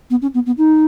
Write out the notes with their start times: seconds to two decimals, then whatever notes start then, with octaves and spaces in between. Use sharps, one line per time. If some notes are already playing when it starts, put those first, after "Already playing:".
0.10 B3
0.22 C#4
0.34 B3
0.46 B3
0.58 D#4